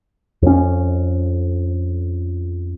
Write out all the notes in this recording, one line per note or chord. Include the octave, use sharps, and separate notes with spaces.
F2 C#4